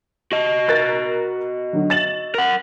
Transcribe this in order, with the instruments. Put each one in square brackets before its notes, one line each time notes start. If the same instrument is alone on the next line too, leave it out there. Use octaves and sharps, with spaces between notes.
[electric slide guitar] F#4 D#5
[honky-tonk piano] A#4 F#6 A6
D3 F#3
A6 E7 F#7
[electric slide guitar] A#4 F#5